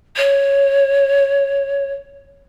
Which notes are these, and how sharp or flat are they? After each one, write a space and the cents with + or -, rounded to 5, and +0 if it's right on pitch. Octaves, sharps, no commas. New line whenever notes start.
C#5 +0